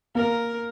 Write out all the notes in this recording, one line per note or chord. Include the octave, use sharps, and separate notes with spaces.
A#3 A#4